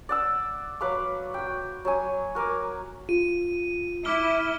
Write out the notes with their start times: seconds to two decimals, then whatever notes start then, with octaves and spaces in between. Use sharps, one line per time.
0.09 D5 F#5 E6
0.81 F#3 B4 F5 D6
1.34 F#4 G5
1.85 F#3 C#5 G#5
2.35 F#4 A#4 G#5 D6
3.09 F4 D#7
4.05 E4 D6 F6 G7